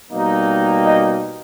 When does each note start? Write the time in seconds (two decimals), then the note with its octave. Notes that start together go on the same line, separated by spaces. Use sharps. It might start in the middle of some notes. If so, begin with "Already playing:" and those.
0.11 B2 G3 A#3 D#4
0.86 D#5